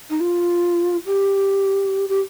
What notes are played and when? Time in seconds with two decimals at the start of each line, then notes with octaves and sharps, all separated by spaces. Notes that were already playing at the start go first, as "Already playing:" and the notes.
0.10 D#4
0.20 F4
1.06 G4
2.09 G4